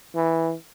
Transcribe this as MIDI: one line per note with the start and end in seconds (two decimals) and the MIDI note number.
0.16 0.54 52